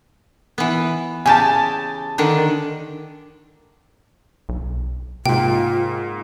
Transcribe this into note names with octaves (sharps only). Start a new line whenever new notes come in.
E3 B3
C#3 G4 G#5 A5
D3 D#3 D4
B1
G#2 C3 A#3 F4 G5